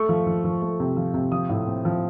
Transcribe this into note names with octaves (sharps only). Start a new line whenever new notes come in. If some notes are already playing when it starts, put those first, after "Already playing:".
Already playing: A3 C#6
F3
F3
F3
A3
C3
F3
C3
F3 D#6
A2
C4
F3